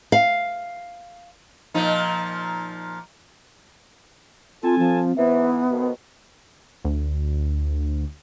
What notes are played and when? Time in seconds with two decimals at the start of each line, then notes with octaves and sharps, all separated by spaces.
0.12 F5
1.74 A#2 F3 D#4
4.63 C4 F4 A4 G#5 A5
4.79 F3
5.17 G#2 E3 B3 E5
5.71 F2 B2 D#3
6.85 D2